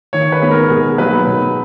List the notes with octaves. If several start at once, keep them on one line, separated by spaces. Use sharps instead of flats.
D#3 C#5
B4
G#3 B3 D#4
A#4
B2 G#4
F#3 A#3 D#4 B4
B2